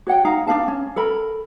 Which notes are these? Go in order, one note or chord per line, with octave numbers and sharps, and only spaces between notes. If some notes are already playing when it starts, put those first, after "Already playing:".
F#4 C#5 F#5 G5
D#4 F5 A#5
D4 D#4 F5 A5
C#4
A4 A#4 B5